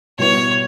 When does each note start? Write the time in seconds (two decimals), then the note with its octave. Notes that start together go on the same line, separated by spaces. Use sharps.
0.19 B2 G3 B3 E4 C#5